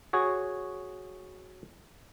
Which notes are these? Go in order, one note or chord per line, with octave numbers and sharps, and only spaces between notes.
F#4 G#4 C#5